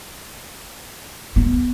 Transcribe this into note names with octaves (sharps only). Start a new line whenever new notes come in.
B3